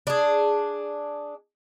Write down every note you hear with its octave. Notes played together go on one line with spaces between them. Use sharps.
D4 G#4